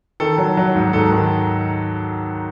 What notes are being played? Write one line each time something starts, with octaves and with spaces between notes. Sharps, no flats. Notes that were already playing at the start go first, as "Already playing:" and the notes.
D#3 A4
F#3
F#3
G#2
G#2 A4
D#3